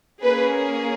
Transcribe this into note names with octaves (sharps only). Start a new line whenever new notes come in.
A#3 C#4 G#4 B4